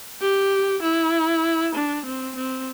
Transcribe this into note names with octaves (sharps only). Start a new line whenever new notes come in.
G4
E4
D4
C4
C4